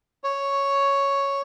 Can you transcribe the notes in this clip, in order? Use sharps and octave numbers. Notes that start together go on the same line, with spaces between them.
C#5